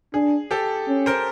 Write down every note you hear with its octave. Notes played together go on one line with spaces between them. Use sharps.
D4 G#4
G4 A4
C#4
A#4 C5